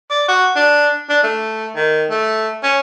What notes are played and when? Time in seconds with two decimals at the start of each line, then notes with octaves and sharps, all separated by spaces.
0.10 D5
0.28 F#4
0.56 D4
1.09 D4
1.23 A3
1.75 D#3
2.10 A3
2.63 C#4